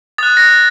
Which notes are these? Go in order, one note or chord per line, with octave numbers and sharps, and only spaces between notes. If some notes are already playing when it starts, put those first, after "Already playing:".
D#6 F#6 A6
A#6